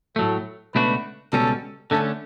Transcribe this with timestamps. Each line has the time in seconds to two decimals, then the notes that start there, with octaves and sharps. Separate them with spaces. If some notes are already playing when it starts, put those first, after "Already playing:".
0.16 A2 F#3 A3 A4
0.74 C#2 B2 A3 D4 F#4 B4
1.33 C#2 B2 G3 C#4 A4
1.91 D3 A3 C#4 A4